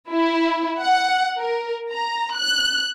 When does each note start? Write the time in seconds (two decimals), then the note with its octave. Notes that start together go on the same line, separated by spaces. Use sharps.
0.10 E4
0.81 F#5
1.38 A#4
1.93 A#5
2.35 F#6